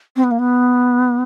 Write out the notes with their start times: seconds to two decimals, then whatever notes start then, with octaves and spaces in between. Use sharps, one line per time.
0.16 C4
0.24 B3
0.31 A#3
0.39 B3